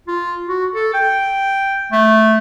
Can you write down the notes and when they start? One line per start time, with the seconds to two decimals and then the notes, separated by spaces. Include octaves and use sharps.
0.08 F4
0.49 F#4
0.75 A4
0.94 G5
1.92 A3